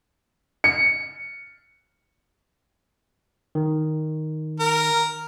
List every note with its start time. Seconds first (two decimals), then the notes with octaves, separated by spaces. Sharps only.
0.64 C#7
3.55 D#3
4.60 A#4